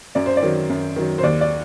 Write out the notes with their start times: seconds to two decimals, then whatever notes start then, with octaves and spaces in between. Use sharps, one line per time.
0.15 F#2 D5
0.26 C5
0.37 D5
0.42 D#3 F#3
0.70 F#2
0.96 D#3 F#3
1.18 C5
1.23 D#2 D5
1.41 D5